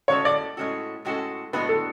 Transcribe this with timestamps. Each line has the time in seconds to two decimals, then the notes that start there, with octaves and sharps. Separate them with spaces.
0.08 A2 G#3 C#4 F#4 A4 C#5
0.25 D5
0.57 A2 G#3 C#4 F#4 A4
1.05 A2 G#3 C#4 F#4 A4
1.53 A2 G#3 B3 D4 F#4 B4
1.69 A4